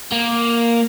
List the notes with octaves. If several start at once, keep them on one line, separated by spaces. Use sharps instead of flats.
A#3